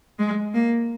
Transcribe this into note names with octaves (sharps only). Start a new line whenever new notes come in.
G#3
A#3